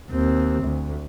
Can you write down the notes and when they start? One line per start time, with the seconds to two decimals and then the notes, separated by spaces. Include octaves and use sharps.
0.10 D#2 C4
0.63 D2